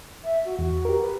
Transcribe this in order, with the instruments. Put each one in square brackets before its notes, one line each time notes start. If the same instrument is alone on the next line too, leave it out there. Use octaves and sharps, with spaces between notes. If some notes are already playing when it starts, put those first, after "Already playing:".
[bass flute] E5
F#4
[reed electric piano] E2 [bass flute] F#4
[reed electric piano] G4 A#4
[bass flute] B4